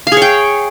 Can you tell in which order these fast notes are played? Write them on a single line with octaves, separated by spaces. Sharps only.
F5 G#4 C#5 G5